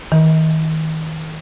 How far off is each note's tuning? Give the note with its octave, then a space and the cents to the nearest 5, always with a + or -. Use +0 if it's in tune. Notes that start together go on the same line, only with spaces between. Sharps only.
D#3 +30